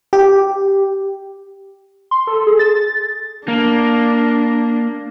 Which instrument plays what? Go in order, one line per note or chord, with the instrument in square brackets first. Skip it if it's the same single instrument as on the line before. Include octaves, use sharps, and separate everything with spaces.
[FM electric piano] G4
[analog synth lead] C6
A4
G#4
A6
[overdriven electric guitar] A#3 [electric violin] D4